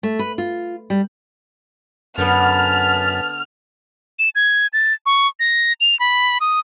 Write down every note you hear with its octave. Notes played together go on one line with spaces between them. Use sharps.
A3
B4
F4
G3
F#2 D3 B3 B4 A5 F6
E7
G#6
A6
C#6
A#6
F7
B5
D#6